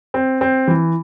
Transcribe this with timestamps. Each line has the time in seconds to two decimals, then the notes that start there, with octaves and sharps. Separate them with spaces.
0.14 C4
0.41 C4
0.68 E3